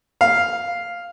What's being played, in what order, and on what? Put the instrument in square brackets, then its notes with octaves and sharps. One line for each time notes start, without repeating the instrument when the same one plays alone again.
[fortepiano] F5